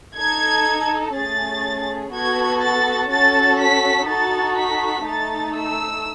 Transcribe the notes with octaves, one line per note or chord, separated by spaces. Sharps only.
D#4 A4 G#6
A3 C#4 G#4 A6
B3 F#4 A4 G#6
A6
C#4 F#4 A4 A6
B6
D#4 F#4 A4 A6
B6
A3 D#4 A4 A6
E6